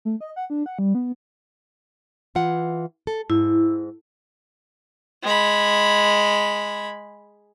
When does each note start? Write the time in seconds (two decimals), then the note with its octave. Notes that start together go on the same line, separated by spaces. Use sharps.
0.05 A3
0.21 D#5
0.36 F#5
0.50 D4
0.66 F#5
0.79 G3
0.95 B3
2.35 E3 F4 F#5
3.07 A4
3.30 G#2 E4
5.23 G#3 B5